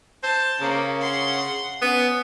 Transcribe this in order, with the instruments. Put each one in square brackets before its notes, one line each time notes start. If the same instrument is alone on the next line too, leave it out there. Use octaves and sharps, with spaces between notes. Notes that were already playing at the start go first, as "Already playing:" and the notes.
[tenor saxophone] C5 [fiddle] A5
[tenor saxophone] C#3 [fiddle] A#3
[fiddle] F#5 C6
[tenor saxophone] B3 [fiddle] C#4